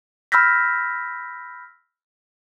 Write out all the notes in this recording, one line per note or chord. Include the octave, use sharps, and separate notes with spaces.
B5 E6 F6 G6 A#6 B6